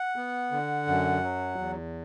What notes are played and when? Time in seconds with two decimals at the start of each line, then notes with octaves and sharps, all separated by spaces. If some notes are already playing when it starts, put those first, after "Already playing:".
Already playing: F#5
0.16 B3
0.52 D3
0.87 F#2
1.23 F#3
1.58 E2